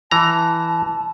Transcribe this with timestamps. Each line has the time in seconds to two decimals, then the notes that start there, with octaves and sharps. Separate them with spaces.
0.11 E3 A5 A#5